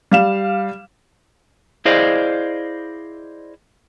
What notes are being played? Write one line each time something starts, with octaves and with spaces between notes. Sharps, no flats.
G3 F5 E7
E4 G#4 C5 D5 D#5 F5